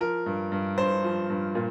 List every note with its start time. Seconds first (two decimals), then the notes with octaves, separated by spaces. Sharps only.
0.01 F3 A#4
0.26 G2
0.52 G2
0.78 G2 C5
1.04 F3
1.30 G2
1.55 A#2